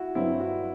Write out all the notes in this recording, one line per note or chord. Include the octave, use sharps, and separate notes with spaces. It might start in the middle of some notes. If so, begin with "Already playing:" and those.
Already playing: E4 F#4
G2 F#3 C4 E4
F#4